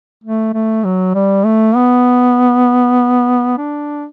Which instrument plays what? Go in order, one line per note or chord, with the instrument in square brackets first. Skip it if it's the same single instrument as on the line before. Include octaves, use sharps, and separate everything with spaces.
[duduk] A3
A3
F#3
G3
A3
B3
D4